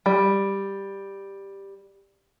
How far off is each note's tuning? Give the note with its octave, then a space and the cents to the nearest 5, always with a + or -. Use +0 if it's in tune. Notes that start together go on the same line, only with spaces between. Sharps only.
G3 +5